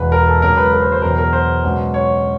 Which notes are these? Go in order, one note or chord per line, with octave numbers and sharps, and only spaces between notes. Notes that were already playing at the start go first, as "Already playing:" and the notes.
Already playing: E1 E2 B2 B4
A#4
A4
C#2 C#3 F#3 A#4
B4
A#4
C5
C5
E2 B2 F#3 A#4
A#4
C5
C#2 B2 F#3
C#5